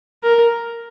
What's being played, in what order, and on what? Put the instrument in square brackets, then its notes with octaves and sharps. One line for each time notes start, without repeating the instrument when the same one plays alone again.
[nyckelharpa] A#4